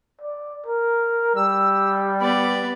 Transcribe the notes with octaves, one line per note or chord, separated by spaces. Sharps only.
D5
A#4
G3 E6
B3 D5 B5